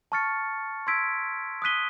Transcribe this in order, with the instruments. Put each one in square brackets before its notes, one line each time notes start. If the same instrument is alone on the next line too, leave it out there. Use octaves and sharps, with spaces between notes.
[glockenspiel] A5 C#6 F6 A6 C#7
C6 E6 G#6 B6 D7
D#6 F#6 B6 D#7 G7